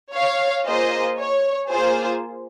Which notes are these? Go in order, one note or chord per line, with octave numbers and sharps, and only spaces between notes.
C#5 F5
A#3 F4 G#4 C5 D#5
C#5
A#3 F4 G#4 C5